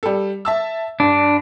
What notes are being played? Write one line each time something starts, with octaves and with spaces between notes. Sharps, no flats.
G3 A4
E5 A5 E6
G2 D4